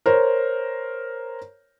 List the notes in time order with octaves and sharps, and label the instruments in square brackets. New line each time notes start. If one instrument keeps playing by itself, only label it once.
[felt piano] A#4 C5 C#5